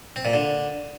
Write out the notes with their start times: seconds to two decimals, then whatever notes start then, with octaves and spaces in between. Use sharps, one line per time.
0.16 C4
0.25 A#2
0.34 D3